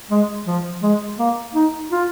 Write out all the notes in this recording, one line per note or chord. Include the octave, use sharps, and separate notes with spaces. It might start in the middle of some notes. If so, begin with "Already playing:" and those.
G#3
F3
G#3
A#3
D#4
F4